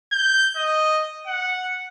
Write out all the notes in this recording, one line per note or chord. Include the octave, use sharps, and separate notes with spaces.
G6
D#5
F#5